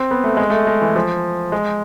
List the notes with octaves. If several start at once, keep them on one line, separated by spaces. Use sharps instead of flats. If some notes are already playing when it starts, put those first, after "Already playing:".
Already playing: C4
B3
A3
G#3
A3
G#3
E3
F3
G#3